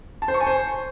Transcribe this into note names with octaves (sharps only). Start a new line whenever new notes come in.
A5
C5
C#6
G#5
C5